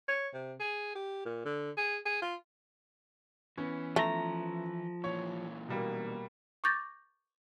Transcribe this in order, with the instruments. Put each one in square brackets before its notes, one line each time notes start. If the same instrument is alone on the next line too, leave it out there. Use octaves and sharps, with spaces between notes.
[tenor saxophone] C#5
C3
G#4
G4
A#2
D3
G#4
G#4
F4
[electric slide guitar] E3 [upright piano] B3 C#4
[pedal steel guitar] F3 A#5 [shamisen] A3
[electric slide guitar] A#2 E3 [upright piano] C#5
[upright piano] B2 G3 A#3
[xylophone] C#6 D6 G6 A6 A#6